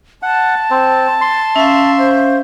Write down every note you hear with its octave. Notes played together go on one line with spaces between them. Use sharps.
F#5 A5
C4
C6
C#4 E5 F5
C5